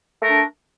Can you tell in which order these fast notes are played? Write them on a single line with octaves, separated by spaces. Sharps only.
A3 A#4 D4